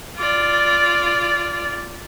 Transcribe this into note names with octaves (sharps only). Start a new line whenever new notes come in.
F4 D5